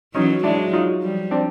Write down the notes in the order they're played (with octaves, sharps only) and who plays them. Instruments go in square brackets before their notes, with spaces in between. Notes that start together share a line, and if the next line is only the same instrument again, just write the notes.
[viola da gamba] E3 F#3 [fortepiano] C#4 D#4
[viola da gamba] F#3 G#3 [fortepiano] D4 E4
[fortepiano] D#4 F4
[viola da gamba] F3 G3
[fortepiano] C4 D4